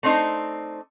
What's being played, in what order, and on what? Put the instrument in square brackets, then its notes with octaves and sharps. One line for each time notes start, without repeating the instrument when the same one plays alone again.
[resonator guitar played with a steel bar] A3 C4 D4 D#4 C5